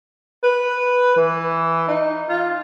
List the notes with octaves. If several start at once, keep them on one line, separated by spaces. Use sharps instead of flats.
B4
E3
D#4
F4